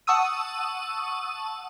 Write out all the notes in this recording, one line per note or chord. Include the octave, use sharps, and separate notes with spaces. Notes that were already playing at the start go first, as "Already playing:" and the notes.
F#5 A5 C#6 D#6 E6 D#7